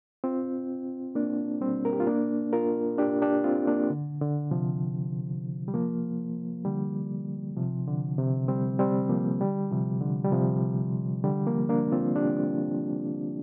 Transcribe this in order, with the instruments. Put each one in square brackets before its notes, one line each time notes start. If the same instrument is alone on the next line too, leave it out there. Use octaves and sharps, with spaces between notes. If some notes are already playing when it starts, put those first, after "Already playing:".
[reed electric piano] C4 F4
A#3 D4
G3 C4
A#4
G4
F4
A#3 D4
F4 A#4
D4 G4
D4 G4
C4 F4
A#3 D4
D3
D3
C3 F3
G3
F3 A#3
D3 G3
C3 F3
D3
C3
G3 C4
G3 C4
F3 A#3
D3 G3
C3 F3
D3
G3
C3 F3
D3 G3
F3 A#3
A#3 D4
C4 F4
D4 G4